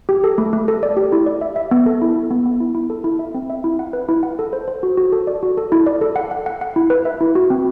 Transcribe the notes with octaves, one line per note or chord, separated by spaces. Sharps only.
G4
A4
A3
A3
A4
D5
G4
E4
D5
E5
E5
B3
A4
E4
E4
B3
B3
E4
E4
A4
E4
E5
C4
E5
E4
F#5
B4
E4
F#5
A4
C5
C5
F#4
F#4
A4
D5
F#4
A4
E4
D5
A4
F#5
F#5
F#5
F#5
E4
B4
E5
E4
F#4
C4